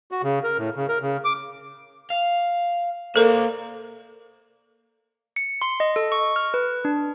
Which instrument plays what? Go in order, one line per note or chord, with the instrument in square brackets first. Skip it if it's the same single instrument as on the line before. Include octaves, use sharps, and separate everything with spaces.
[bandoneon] F#4
C#3
A#4
A2
C#3
A#4
C#3
D6
[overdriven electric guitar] F5
[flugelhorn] A#3 [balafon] A4 A#4 [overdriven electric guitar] C5 D5
[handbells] C#7
C6
D#5
A4
C#6
F6
B4
D4